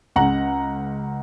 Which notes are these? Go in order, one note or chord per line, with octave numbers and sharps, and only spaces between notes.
C#2 C#3 F#5 A#5